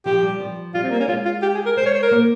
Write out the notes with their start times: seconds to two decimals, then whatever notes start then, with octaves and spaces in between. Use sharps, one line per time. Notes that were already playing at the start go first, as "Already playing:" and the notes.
0.06 F3 G4
0.23 G3
0.40 F3
0.74 G3 F4
0.83 C4
0.91 A#3
1.00 C#4
1.08 G#3 F4
1.25 F4
1.42 G4
1.54 G#4
1.66 A#4
1.77 G#3 C5
1.86 C#5
1.94 C5
2.03 A#4
2.11 A#3